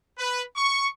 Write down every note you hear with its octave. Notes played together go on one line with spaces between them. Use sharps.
B4
C#6